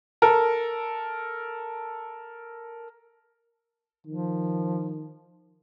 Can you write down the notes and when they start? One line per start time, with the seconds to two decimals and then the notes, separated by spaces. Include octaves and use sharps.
0.22 A4 A#4
4.07 D#3 F3